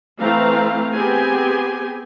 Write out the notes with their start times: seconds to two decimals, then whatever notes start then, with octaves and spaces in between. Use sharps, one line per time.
0.20 E3 A3 C4 B4 F5 A#5
0.93 B3 C4 G4 G#4 G#5